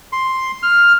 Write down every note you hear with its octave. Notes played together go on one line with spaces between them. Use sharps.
C6
F6